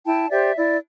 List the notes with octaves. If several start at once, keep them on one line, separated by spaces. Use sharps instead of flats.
E4 G5 A5
G4 C5 D5 E5
E4 D5